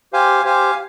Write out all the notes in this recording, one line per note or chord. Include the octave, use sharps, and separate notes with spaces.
G4 C5 F5 G#5
G4 C5 F5 G#5